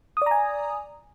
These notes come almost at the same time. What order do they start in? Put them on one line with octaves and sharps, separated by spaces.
D#6 D5 A#5 G#5